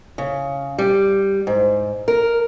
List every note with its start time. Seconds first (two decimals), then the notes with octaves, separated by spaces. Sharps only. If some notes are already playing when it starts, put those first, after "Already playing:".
0.18 C#3
0.78 G3
1.47 G#2
2.08 A#4